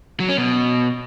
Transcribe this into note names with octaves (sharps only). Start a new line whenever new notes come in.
F#3
C#4
B2